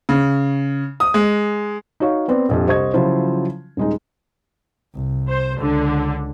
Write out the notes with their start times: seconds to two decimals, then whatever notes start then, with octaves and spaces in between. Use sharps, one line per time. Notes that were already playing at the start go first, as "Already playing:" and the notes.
0.09 C#3
1.00 D#6
1.14 G#3
2.00 D#4 F#4 C#5 F5 C#6
2.28 B3 C4 B4 D5
2.49 A#1 F2 G4
2.67 C2 C5 D#5 C#6 G#6
2.94 C#3 F3 F#3 E4 F4 C5
3.77 D#1 G#3 D#4
4.94 C2
5.28 C5
5.60 C#2 D3